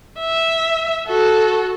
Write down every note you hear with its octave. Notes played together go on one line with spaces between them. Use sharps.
E5
F#4 A4